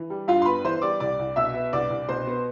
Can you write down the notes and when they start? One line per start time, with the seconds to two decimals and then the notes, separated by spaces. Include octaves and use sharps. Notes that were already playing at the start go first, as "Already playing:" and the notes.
Already playing: E3
0.10 G3
0.28 G2 F4 F5
0.42 C6
0.46 B3 B4 B5
0.65 E3 C5 C6
0.82 G3 D5 D6
1.00 C2 D5 D6
1.19 C2
1.36 B2 E5 E6
1.54 B3
1.73 C2 D5 D6
1.90 C2
2.09 B2 C5 C6
2.27 B3